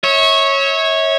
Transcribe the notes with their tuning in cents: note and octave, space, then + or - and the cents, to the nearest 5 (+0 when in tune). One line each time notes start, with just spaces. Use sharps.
C#5 -10 E5 -35